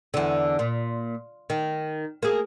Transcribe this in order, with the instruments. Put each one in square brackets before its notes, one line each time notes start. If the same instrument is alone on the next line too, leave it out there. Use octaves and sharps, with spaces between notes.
[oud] E2 D3
A#2
D#3
A#3 G#4